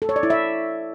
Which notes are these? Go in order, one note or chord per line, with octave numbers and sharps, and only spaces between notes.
A4
C#5
D5
E4
E5